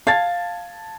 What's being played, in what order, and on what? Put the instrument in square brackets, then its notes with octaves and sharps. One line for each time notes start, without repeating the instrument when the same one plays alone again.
[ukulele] F5 [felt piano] A5 G#6 A6